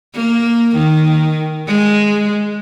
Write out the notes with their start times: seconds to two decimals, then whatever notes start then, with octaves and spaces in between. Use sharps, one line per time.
0.14 A#3
0.76 D#3
1.68 G#3